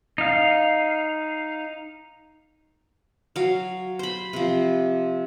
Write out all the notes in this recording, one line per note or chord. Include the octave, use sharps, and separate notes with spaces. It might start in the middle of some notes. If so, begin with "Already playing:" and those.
D#4 F5
F#3 F5
C5 B5
C3 F3